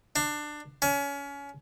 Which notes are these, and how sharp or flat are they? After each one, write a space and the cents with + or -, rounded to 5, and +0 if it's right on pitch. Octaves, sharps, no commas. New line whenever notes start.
D4 +20
C#4 +30